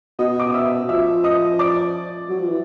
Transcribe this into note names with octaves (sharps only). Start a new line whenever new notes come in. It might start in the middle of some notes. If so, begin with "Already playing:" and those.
B2 D#5 D#6
D6
D#6
E5 E6
F3 E5 E6
D#5 D#6
D5 D6
F#3
F3
E3